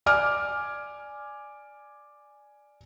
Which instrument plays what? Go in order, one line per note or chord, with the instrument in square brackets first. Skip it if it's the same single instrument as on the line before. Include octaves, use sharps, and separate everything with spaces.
[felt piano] D5 G#5 D6 F6